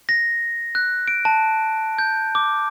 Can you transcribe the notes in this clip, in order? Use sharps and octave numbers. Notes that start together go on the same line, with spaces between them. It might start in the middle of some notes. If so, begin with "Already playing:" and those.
A#6
F#6
D7
A5
G6
D6